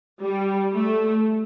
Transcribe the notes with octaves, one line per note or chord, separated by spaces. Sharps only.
G3
A3